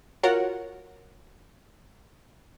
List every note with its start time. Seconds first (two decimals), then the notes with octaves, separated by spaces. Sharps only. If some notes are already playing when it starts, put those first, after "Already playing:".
0.23 F4 F#4 A#4 C#5 F#5